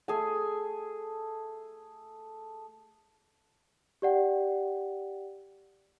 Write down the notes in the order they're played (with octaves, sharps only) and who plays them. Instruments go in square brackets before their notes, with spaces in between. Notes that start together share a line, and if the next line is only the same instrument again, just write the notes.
[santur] A3 G#4 G#5
[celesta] G4 D5 F#5 G5